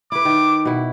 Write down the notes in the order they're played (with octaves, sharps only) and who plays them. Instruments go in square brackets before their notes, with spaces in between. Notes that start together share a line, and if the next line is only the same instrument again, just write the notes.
[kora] E4 B4 [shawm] D6
[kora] D#3
B2 E4